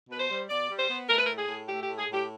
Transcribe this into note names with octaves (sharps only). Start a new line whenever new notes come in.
B2 B4
C5
G3
B2 D5
G3
C5
B3
A3 A#4
B4
A2 A#4
G#4
A2
A3 G4
A2 G4
G#4
A2
G4